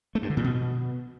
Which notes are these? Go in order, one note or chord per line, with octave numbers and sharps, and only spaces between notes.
A3
G2
D3
A#2
B2